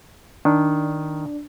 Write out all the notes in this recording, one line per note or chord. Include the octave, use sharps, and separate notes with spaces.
D#3 D4